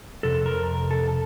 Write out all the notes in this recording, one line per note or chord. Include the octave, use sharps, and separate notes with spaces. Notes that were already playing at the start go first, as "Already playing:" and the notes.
F2 C3 A4
A#4
A4